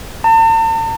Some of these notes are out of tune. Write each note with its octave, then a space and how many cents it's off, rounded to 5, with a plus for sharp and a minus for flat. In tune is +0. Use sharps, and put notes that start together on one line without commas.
A5 +45